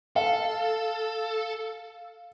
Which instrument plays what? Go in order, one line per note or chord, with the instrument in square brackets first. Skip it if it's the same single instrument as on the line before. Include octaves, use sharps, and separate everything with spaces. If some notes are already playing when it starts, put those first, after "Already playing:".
[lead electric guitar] A4 [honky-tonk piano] F5